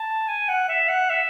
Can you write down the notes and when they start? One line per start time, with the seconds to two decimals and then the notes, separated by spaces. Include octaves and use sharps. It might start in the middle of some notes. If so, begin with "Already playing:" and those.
Already playing: A5
0.28 G#5
0.49 F#5
0.69 E5
0.89 F#5
1.10 E5